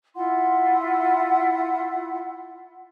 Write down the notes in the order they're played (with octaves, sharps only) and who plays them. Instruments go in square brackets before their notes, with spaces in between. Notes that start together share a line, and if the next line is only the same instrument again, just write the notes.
[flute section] E4 F4 F#5 C6